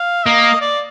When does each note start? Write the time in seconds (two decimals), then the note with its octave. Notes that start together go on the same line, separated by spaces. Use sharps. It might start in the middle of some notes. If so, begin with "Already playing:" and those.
Already playing: F5
0.26 A#3 D#5
0.61 D5